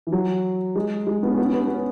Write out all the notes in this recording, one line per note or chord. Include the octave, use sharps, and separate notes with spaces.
E3
F#3
G#3
G#3
B3
C#4
B3
C#4
B3
C#4
B3
C#4